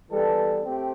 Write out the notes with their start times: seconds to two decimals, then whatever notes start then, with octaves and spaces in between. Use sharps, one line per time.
0.10 E3 G3 B3 A4
0.62 A3 C4 G4